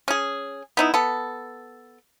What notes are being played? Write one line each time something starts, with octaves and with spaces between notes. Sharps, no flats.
C#4 G#4
B3 D#4 E4
B3 A4